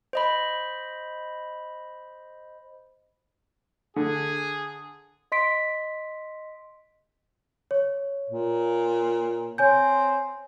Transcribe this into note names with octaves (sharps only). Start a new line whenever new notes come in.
C5 D#5 B5
D3 G#4
D#5 C6 B6 D7
C#5
A#2
C4 C#5 G#5 G6